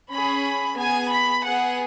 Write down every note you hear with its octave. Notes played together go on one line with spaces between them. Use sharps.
C#4 G#4 B5
B3 G#4 G#5
B5
B3 G#4 F#5